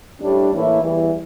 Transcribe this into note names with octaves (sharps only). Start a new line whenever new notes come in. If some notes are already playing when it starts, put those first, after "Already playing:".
A2 G3 D4
A2 E3 A#3 E4
E2 E3 G3